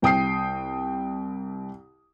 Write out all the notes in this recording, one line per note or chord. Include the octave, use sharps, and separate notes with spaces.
C2 G5 D#6 C7